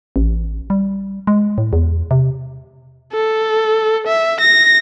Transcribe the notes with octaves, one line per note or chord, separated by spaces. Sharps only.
A1
G3
G#3
A2
E2
C3
A4
E5
A#6